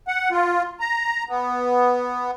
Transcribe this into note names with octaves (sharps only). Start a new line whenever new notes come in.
F#5
F4
A#5
B3